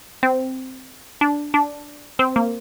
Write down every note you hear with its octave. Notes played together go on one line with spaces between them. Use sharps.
C4
D4
D4
C4
A#3